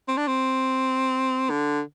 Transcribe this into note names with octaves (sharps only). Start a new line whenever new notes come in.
C4
D4
C4
D3